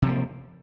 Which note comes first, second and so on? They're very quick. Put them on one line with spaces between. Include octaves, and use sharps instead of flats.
C3 F3 A#3